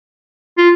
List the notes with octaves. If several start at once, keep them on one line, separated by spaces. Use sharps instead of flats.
F4